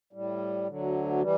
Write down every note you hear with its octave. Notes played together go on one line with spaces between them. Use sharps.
A2 G3
D2 D3 F#3
E3 G3